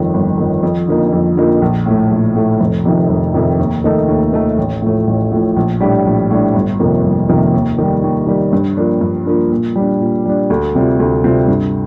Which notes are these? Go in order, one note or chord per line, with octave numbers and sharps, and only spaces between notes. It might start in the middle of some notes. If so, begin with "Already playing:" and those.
Already playing: G1 F2 D#3
G1
F2 D#3
F2
D3 F3 A#3 D#4
F2
D3 F3 A#3 D#4
A#1
A2 A3
A#1
A2 A3
F1
F2 C3 D#3
F1
F2 C3 D#3
D#2
D#3 A3 D#4 A4
D#2
D#3 A3 D#4 A4
A1
A2 F3 A3
A1
A2 F3 A3
A#1
A2 G3 D4
A#1
A2 G3 D4
G1
F2 C3 D#3 A#3
G1
F2 C3 D#3 A#3
D#2
D#3 G3
D#2
D#3 G3
G2
F3 A#3 D4
G2
F3 A#3 D4
A#2
G3 D4
A#2
G3 D4
D2
C3 G3 C4 F4
D2
C3 G3 C4 F4
G2